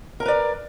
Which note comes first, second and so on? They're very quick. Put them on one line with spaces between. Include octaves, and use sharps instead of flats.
A#4 A#5 B4 D5